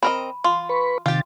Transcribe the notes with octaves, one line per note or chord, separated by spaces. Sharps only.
C4 A#4 D#5 B5
F4 C6
B4 B5 C#6
C3 D#3 F4 G4 A6